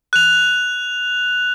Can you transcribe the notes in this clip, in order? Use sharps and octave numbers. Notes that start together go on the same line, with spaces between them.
F#6 F7